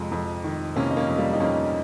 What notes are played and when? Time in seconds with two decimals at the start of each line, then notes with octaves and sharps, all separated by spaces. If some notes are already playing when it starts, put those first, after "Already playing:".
Already playing: F2 C3 G#3
0.12 F2
0.44 D#3
0.76 C3 A#3 C#4
0.91 D#4
0.97 A#3 C#4
1.08 F2
1.18 G3 A#3
1.33 D#4
1.40 F2 A#3 C#4